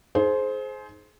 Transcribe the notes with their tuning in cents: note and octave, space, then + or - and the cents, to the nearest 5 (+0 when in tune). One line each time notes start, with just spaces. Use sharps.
D#4 +0 G#4 +35 C5 +0